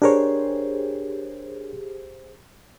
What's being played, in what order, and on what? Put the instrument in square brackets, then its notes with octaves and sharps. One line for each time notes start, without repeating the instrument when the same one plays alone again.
[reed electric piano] D4 A#4 C#5 [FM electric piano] G4 G#4 C5